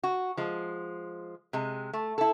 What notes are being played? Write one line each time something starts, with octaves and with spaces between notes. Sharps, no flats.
F#4
F3 G#3
C3 G#3
A3
E4 A4